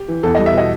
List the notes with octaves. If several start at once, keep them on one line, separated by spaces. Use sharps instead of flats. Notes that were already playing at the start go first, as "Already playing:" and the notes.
Already playing: G4
E3
E2 A4
G3 D#5
E5
B2 D#5